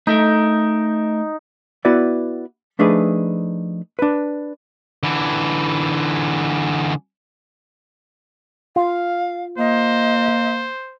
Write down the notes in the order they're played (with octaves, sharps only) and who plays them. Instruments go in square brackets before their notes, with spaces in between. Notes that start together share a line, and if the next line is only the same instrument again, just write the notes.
[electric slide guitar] A3 A4 A#4 [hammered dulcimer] D#4
[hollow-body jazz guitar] B3 E4 F#4 B4 D5
F3 A3 D4 D#4 G#4 B4
D4 B4
[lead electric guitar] D3 E3
[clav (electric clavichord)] F4 [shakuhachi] F5
[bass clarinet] A#3 [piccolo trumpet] C5 [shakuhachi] D#5